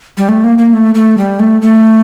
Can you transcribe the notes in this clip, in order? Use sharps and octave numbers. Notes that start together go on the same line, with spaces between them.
G3
A3
A#3
A#3
A3
A3
G3
A3
A3